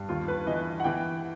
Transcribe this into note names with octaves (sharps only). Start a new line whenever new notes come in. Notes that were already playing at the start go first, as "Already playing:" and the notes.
Already playing: G2 G3
D#2 F4
B4
E3 D#5
F#5
E3 G5